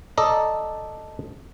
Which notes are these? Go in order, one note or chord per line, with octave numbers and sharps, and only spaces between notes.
A4 D5 D#5 A#5